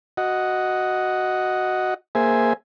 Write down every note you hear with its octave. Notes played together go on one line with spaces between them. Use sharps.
F#4 D#5 F#5
A#3 G#4 C5 E5 G#5